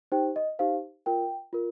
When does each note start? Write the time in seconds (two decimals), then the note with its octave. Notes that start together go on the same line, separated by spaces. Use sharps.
0.12 D#4 G4 C5 G5
0.36 D#5
0.59 D#4 G4 C5 F5
1.06 F4 A#4 G5
1.53 F4 A#4